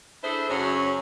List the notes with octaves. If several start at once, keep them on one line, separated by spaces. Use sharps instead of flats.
D4 E4 G#4 A4 C5
F#2 C#3 F#3 C#4